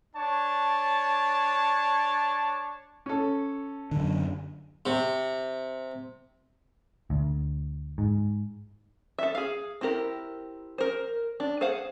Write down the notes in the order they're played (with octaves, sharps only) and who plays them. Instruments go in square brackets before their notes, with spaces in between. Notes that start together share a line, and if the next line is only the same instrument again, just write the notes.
[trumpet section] D4 C#5 A5
[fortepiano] C#4 A4
[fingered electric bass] F#2 D3
[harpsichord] C3
[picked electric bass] D2
G#2
[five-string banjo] A4 E5
G#4 F5
C4 E4 G4 A#4
A#4 C5
D4
G#4 C5 F5 F#5